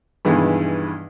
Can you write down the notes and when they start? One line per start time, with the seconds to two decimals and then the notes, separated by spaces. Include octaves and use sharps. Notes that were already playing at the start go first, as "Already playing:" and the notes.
0.25 G2 B2 D#3 E3 G#3